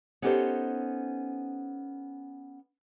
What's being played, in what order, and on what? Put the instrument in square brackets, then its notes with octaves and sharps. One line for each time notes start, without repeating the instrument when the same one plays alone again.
[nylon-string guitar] B3 C#4 D#4 G4 A4 C5